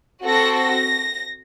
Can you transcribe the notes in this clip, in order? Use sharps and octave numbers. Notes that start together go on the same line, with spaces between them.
C4 F#4 A4 A#6
A#6